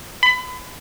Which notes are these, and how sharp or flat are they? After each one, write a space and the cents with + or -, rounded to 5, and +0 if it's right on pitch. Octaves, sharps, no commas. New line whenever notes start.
B5 +30